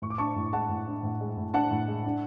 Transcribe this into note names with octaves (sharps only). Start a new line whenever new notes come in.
A2 C#6
D6
D4 A5 C#6
A2
G#3 F#5 A5
A2
D4
A2
G#3
A2
D4 F#5 A5
A2
G#3
D4